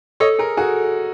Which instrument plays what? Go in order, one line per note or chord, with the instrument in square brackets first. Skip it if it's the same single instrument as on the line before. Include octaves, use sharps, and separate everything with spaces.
[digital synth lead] A4 [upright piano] C#5 D#5
[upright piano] G#4 A#4
F#4 G#4